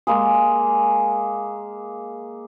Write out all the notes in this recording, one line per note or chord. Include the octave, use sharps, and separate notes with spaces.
G#3 A#3 G#4